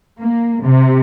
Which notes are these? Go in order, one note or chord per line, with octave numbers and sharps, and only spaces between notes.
A#3
C3